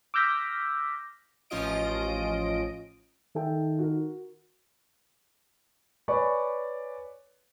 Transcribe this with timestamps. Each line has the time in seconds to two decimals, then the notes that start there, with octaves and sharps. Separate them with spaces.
0.14 D6 E6 F6 G6 A#6 B6
1.50 A1 F3 C#4 F4 D#5 D7
3.35 D#3 A4 E5 G5
3.79 F#4 A#4
6.08 B4 C#5 D5 G#5 B5 C#6